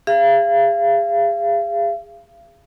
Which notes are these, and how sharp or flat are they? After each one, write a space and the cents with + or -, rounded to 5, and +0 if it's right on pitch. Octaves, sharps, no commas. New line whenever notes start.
G#4 -30 F5 -40